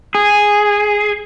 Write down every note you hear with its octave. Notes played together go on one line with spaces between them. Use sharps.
G#4